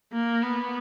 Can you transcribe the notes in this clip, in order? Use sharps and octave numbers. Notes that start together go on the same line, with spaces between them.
A#3
B3